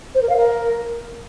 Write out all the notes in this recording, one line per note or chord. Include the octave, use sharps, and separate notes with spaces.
C5
A#4
F5
A#4